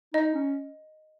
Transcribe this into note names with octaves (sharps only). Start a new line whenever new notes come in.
D#4 D#5
C#4